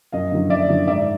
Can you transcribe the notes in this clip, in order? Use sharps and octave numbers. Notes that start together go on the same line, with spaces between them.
F#2 D#5 F5
D3 F#3
F#2 D5 E5
D3 F#3
G#2 D5 E5